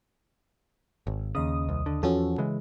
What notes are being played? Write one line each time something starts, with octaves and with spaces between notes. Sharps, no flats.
G#1
D#2 C#3 D#5 D#6
C2
D3
E2 F3 C#4 F#4 A4
C#3 E3 G#3